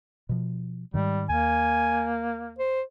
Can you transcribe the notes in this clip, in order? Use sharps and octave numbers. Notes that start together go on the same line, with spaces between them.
B2 F3
G#2 D#3 G3
D#2 A#3 G#5
C5